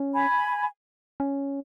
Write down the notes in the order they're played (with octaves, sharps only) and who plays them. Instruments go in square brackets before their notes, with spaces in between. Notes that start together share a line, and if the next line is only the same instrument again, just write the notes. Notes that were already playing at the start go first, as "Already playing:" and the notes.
Already playing: [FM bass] C#4
[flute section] G#5 B5
[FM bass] C#4